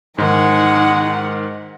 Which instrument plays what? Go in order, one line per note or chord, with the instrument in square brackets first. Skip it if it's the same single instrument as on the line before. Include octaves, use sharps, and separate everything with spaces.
[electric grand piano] G#2 D#3 [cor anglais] G#3 [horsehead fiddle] D#4 F#5